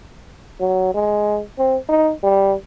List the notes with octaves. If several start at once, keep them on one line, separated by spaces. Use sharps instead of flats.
F#3
G#3
C4
D#4
G3